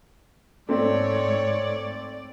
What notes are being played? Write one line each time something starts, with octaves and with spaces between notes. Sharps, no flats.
G#2 A3 C4 C#5 D5